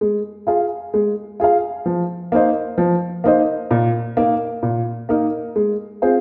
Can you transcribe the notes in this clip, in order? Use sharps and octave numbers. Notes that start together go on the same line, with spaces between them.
G#3
F4 G#4 F5
G#3
F4 G#4 F5
F3
A#3 D#4 C5 D#5
F3
A#3 D#4 C5 D#5
A#2
A#3 D#4 A#4
A#2
A#3 D#4 A#4
G#3
C4 F4 G#4 C5